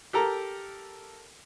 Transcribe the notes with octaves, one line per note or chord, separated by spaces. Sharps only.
G4 A4 A#4 A#5